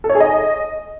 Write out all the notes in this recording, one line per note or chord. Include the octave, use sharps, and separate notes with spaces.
A4
C#5
G#4
D#5